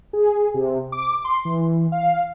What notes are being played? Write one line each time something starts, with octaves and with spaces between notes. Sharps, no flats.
G#4
C3
D6
C6
E3
F5